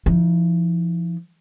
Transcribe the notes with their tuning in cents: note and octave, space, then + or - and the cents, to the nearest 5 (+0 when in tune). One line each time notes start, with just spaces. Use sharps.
F3 -35 D#4 +30